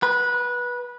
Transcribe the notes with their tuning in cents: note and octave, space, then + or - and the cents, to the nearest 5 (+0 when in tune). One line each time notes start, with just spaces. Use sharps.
B4 -20